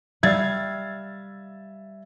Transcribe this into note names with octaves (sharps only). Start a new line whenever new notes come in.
G3 E5 F5 E6 G#6 A6